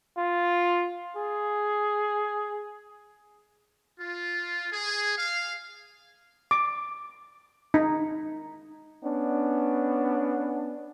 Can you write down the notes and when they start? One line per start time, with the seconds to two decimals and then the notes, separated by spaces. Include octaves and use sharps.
0.17 F4
1.17 G#4
3.98 F4
4.71 G#4
5.16 F5
6.51 D6
7.74 D#4
9.03 B3 C#4 D4